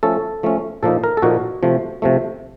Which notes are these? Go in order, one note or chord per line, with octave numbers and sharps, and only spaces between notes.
F3 A3 C#4 A4
F3 A3 C#4
A#2 F3 A#3 D#4 A4
A#4
A4
A#2 F3 A#3 D#4 F#4
C3 F3 A3
C3 F3 A3